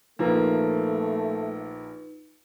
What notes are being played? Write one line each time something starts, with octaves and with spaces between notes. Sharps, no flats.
A#1 F3 A3 A#3 D#4 F4 B4